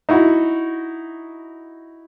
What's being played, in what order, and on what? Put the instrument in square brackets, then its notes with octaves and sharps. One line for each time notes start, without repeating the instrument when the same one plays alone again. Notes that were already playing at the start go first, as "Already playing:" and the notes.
[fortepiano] D#4 E4 F#4